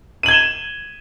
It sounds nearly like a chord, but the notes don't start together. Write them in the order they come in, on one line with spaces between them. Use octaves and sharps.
D#7 F#7 G#6 G7 E7